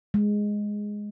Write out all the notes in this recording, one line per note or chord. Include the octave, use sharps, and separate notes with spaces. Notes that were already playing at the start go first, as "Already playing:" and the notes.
G#3